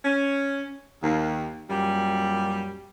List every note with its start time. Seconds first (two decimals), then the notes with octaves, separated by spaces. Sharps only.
0.04 C#4
1.03 D#2
1.70 F#2 A#2 G3